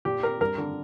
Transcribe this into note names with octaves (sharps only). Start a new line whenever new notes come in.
A#2 G4
A#4
G2 A#4
D3